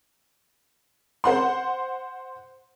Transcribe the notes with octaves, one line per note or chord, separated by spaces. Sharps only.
C5 F#5 C6